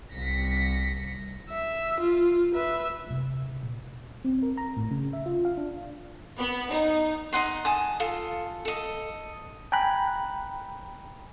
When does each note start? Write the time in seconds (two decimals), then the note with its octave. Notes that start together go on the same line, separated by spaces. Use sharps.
0.11 C2 A#6 B6 C#7
1.50 E5
2.01 F4
2.55 B4 E5
3.06 C3 A#3
3.42 C#3
3.63 A#2
3.79 D3
4.25 C4
4.43 A#4
4.57 A#5
4.77 A2
4.91 C#3
5.13 E5
5.26 F4
5.45 F5
5.57 D4
6.38 B3
6.71 D#4
7.33 D#4 D#5 F#5 C6
7.65 G#5 A5 D#6
8.00 F4 A4
8.65 A4 D#5
9.72 G5 G#5 A#5 B5 F#6